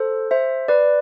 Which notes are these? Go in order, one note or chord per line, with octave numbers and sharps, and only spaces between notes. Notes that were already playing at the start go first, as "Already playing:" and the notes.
Already playing: A4 C5
C5 E5
B4 D5